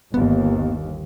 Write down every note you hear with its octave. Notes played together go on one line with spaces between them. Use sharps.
G1 D#2 B3